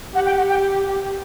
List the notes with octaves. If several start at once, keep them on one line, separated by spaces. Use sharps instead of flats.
G4 F#5
G5
F#5
G5